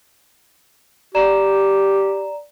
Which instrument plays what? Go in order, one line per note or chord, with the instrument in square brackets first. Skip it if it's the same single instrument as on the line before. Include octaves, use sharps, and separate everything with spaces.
[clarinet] G4 [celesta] D5 A#5 E7